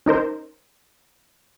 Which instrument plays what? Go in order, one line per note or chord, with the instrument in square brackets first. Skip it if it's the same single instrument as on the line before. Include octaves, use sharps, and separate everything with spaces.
[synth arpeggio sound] C#4 D#4 A#4 C5